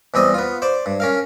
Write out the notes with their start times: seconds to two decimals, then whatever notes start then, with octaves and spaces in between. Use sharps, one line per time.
0.14 E2 G3 C4 D#5
0.34 B3 F4
0.62 C5 D5
0.86 G2
1.00 C#4 A#4 F5